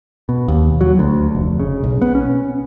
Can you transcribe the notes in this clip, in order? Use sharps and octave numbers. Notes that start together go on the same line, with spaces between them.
B2
D#2
F#3
D2
F1
C#3
B1
B3
C#4